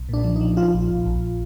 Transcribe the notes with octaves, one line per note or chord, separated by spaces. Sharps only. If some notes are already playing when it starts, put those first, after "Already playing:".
Already playing: B1
A#2 D4
F3
D#4
F3
F3 F4
A#1
A#1
A#1